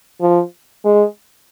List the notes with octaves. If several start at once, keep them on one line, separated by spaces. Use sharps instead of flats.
F3
G#3